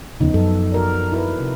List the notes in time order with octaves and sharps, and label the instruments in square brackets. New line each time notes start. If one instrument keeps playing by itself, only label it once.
[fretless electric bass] D#2 C#3 [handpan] F3 B3 D#4
[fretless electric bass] F#2 [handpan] A4
[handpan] F#4 A#4 D5
E4 A#4 B4
C3